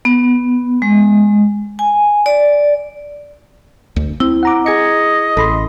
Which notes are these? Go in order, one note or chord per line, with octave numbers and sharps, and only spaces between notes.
B3
G#3
G#5
D5
D2
C4 E4
F#5 A#5 D6
G#4 D#5 G#6 C#7
A1 A4 B5 C6